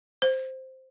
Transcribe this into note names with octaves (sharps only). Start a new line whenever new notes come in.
C5